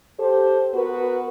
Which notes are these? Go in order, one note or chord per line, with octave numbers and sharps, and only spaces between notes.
G4 A4 C5
B3 F#4 A#4 B4